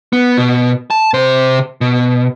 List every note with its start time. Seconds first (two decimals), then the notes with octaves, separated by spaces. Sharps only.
0.13 B3
0.37 B2
0.90 A5
1.14 C3 C5
1.81 B2